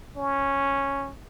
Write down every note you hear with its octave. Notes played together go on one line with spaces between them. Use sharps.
C#4